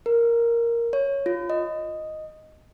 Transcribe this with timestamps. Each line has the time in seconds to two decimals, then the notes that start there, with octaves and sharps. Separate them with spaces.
0.06 A#4
0.93 C#5
1.26 F4
1.50 D#5